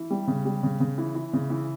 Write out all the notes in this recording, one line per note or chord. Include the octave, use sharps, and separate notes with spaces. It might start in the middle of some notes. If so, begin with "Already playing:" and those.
Already playing: E3
G3
C#3
G3
C#3
C#3
E3
E3
C#3
E3